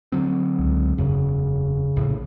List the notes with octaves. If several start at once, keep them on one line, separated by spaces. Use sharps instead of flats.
D3 F#3 C4
C#2
E1 F#2 C#3
A#1 A2